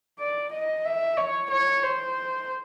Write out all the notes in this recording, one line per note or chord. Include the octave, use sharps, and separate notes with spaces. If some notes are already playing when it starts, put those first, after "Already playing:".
D5
D#5
E5
C#5
C#5
C5